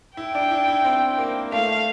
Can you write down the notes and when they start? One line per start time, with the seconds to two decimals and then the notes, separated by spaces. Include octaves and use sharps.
0.17 E4 G5
0.35 D4
0.51 E4
0.68 E4
0.84 C4
1.18 A#3
1.52 A3 F5